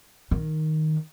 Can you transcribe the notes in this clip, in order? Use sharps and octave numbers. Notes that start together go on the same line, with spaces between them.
D#3